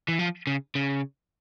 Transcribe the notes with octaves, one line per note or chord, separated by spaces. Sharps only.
E3
F3
C#3
C#3